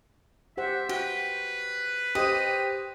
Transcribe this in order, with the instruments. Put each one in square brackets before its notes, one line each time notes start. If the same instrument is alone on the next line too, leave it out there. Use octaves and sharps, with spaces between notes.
[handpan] G4 C5 F#5 [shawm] E5
[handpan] F#4 [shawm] B4 [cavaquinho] G5
[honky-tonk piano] G4 C5 [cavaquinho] D#5